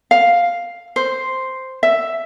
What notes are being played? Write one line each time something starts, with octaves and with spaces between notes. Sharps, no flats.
F5
C5
E5